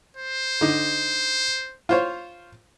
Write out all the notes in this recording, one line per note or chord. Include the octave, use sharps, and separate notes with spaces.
C5
D3 D#4
F4 C5 C#5